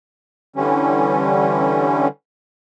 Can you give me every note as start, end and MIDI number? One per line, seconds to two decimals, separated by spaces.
0.56 2.08 50
0.56 2.08 52
0.56 2.08 55
0.56 2.08 61